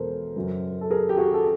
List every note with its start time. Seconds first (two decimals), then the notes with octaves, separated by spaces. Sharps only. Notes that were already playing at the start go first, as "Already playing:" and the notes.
Already playing: E2 B2 G#3 A4 A#4 C5
0.36 F#2 C#3 F#3
0.81 A4
0.90 G#4 A#4
1.09 G4
1.17 F#4 G#4
1.34 A4